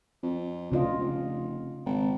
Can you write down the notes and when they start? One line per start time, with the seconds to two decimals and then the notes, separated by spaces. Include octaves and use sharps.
0.23 F2
0.72 D2 C#3 F4 D#5
0.98 F1
1.85 G#1